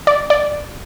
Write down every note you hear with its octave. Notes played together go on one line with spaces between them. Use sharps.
D5
D5